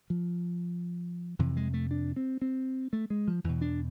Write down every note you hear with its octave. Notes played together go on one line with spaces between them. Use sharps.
F3
F2 C3 E3
G#3
A3
D4
C4
C4
A3
G#3
F3
E2 B2 E3
D4